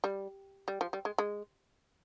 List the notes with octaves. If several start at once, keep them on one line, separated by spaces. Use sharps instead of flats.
G3
G3
F3
G3
G#3
G#3